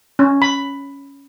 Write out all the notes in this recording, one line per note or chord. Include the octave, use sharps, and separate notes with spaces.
C#4
B5